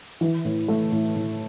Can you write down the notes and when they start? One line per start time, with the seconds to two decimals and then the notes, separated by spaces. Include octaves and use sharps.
0.21 E3
0.45 A2
0.68 A3
0.92 A2
1.16 A2